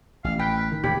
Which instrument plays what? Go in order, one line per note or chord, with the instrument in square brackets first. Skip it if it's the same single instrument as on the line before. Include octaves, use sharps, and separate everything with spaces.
[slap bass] A1 [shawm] F5
[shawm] B4 [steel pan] G5
[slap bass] D#3
[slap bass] E1 A#2 A#3 [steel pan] G4 [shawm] B5